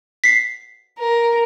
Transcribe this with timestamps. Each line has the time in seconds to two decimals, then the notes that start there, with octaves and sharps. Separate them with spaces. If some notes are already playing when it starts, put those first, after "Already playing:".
0.24 B6 C7
0.98 A#4